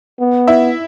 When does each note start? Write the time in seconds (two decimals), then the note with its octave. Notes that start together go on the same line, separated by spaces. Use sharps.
0.20 B3
0.47 E4 E5